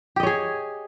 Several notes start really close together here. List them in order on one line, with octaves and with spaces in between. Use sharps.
G4 D#5 C#5 G#4